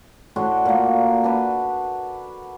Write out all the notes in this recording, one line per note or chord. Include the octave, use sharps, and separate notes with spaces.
A2 D4 F#4 C6
A#2 A#3
D4 B4